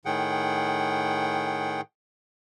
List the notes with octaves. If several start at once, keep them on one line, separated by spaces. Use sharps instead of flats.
A2 D#3 G#4 F#5 G5